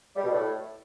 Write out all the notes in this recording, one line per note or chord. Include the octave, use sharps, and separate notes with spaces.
G3
B2
A2